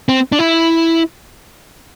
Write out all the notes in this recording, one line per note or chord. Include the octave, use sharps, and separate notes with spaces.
C4
D4
E4